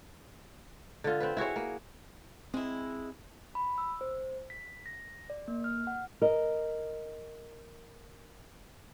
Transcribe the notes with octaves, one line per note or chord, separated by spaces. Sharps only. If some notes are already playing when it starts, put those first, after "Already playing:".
D3 F4
C4 B4
E4 F#4 G#4 C#5
A#3
G#3 C4 E4
B5
E6
C5
B6
A#6
D5
A#3
F6
F#5
A#4 D#5